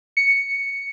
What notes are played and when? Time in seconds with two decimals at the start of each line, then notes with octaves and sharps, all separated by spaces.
0.17 C#7